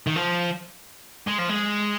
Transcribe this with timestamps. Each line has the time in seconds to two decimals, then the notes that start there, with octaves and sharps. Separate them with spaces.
0.07 D#3
0.16 F3
1.27 G#3
1.38 F3
1.49 G#3